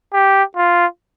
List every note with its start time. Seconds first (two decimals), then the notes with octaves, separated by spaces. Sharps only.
0.13 G4
0.56 F4